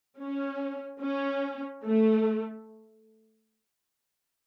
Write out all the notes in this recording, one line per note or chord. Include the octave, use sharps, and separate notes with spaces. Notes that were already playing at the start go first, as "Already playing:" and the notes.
C#4
C#4
A3